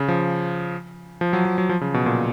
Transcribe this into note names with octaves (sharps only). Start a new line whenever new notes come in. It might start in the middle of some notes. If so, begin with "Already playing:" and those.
Already playing: C#3
F3
F3
F#3
F3
F#3
F3
C#3
B2
A#2